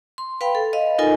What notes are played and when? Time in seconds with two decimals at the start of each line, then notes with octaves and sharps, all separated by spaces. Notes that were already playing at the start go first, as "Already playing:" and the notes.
0.18 C6
0.41 B4 F5 G5 B5
0.55 A4
0.73 D#5 F5
0.98 D#4 F4 A4 A#4 D#5 G#5